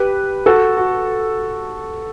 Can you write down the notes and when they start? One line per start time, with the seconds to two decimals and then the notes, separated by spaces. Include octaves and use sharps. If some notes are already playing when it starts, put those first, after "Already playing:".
Already playing: G4 B4
0.46 F#4 A4
0.77 F#4